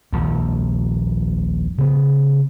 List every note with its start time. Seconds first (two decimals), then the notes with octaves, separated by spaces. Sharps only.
0.13 D#1 A#1 F2
1.78 C#3 B3